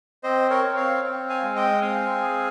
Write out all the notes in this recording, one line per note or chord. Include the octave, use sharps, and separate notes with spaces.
C4 C5 D#5
A#4 C#5
C4
C#5 F5
C4
F5 G#5
G#3
D#5 G5
C4 F5 G#5
G#4